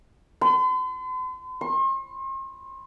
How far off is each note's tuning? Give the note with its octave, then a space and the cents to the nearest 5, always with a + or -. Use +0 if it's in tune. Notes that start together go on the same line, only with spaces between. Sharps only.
C6 -45
C6 +45